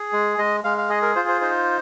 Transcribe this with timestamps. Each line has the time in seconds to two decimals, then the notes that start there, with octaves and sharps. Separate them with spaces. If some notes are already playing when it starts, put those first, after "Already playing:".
Already playing: G#4
0.13 G#3
0.38 G#3 D#5
0.64 G#3 F5
0.78 F5
0.89 G#4 D#5
1.02 A#4
1.15 F4 C5
1.28 C5
1.41 D#4 C5